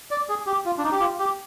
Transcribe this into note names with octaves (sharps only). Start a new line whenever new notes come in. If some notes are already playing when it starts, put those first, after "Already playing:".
D5
G#4
G4
F4
D4
D#4
G4
F4
G4